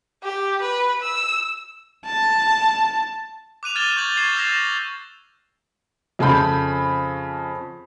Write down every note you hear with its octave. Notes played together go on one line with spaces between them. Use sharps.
G4
B4
E6
A5
D6 F#6 D#7 F7
D6 F6 G#6 A6 E7 G7
C#6 G6 F#7
G#6 C7 E7 F7
E6 G6 A6 A#6 E7
F2 C#3 A4 A5 B5 G6